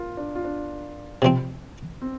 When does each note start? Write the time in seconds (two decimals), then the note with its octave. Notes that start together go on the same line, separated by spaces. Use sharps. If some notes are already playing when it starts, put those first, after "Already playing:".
Already playing: F4 A#4
0.17 D4
0.35 F4
0.44 D4
1.22 C3 F3 C4
2.02 C4